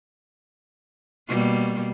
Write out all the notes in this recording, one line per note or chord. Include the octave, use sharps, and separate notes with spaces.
B2 G3 A#3